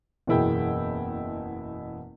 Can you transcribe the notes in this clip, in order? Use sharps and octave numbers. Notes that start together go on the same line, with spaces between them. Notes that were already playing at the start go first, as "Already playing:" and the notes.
F#1 E2 B2 E4 G#4 G5